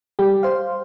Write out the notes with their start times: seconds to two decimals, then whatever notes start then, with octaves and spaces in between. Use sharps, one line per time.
0.19 G3 G4
0.43 C5 F5